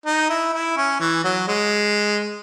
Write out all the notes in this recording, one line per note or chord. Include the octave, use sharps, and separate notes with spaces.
D#4
E4
E4
C#4
E3
F#3
G#3